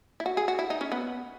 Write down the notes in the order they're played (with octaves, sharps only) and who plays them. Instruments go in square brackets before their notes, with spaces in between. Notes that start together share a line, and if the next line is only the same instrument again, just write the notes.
[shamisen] E4
F#4
G#4
F#4
E4
D#4
C#4
B3